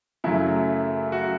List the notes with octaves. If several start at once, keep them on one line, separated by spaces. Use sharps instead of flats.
F#2 C#3 F#3 A3 E4
F#4